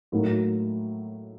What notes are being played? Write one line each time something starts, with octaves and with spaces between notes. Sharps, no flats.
A2 F#3 A#3 D#4 F#4